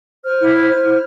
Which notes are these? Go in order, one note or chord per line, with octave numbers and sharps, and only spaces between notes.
C5 F6
E4
C5
C5
E4